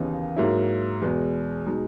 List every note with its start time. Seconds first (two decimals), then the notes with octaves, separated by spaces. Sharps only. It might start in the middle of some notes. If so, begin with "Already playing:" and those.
Already playing: D#2 C#3 E3 B3 D#4
0.36 G#2 F#3 A#3 E4
1.02 E2 B2 G#3 B3
1.66 B2 G#3 D#4